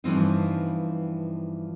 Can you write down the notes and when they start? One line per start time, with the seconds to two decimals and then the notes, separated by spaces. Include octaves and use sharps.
0.04 G2 E3 F3 C4 D#4